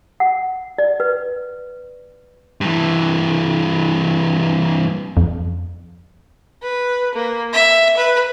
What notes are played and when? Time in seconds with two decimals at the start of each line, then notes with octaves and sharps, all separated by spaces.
0.20 F#5
0.78 D5
1.00 B4
2.61 G2 E3
5.17 F2
6.62 B4
7.15 A#3
7.53 E5
7.97 B4